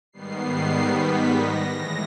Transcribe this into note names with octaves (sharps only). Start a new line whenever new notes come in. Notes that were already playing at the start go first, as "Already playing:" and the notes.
G#2 D#3 G3 B3 C7
B6
A#6
A2 E3 G#3 A#6